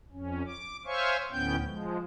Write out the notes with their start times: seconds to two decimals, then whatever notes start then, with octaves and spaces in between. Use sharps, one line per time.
0.12 F2 C#4
0.46 D6
0.85 C5 C#5 E5 F5 G#5 C#6
1.32 D2 A2 B3 C#4 G5 G6
1.64 F3 G#3